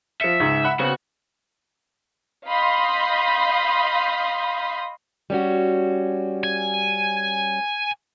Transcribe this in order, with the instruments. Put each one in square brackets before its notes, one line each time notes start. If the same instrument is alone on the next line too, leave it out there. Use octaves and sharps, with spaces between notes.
[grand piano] F3 C#7 [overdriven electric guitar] E5
[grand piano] C#2 G#2
F#5 B5 F#6
[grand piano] C#3 B3 C4 [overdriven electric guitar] F#4
[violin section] D#5 F5 B5 C6 D#6 G6
[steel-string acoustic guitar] G3 C#4 F#4
[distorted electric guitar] G#5